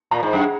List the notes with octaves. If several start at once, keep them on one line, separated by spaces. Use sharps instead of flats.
A#2 A#5
G#2
F#2 F#5